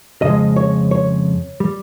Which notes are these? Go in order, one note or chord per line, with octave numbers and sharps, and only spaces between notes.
F2 C#3 G#3 D#5
C#5
C#5
G3